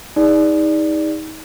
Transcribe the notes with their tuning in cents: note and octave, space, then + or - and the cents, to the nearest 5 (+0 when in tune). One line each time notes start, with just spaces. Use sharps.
D#4 +25 G#4 -30 D5 +0